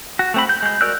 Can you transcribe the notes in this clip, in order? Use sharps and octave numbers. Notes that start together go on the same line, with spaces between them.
F#4
A3 C4 B5
G6
G#3 G6
F#4 A#4 D5 E6 F#6